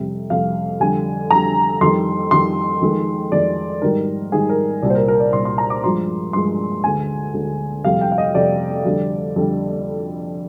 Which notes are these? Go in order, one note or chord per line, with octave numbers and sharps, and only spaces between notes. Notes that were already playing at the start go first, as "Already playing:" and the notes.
Already playing: F2 C3 G3
F2 C3 G3 F5
F2 D3 G3 G#5
F2 D3 G3 A#5
F2 D#3 G3 C6
F2 D#3 G3 C6
F2 D#3 G#3
F2 D#3 G#3 D5
G#2 D#3 G3 A#4
G#2 D#3 G3 G#4
A#4
C2 A#2 G3 D5
C5
A#4
A#4
D5
C2 A#2 G3 C6
C6
A#5
D6
G2 F3 G#3 C6
G2 F3 G#3 C6
D2 D3 G#3 G#5
D2 D3 G#3
F2 C3 G3 F5
G5
F5
D#5
F2 C3 G3 D5
F2 D3 G3
F2 D3 G3